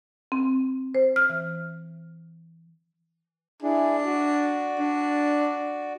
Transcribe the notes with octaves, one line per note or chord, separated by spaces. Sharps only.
C4
C5
F6
E3
D4 E4 G#4
F#4 D5
D4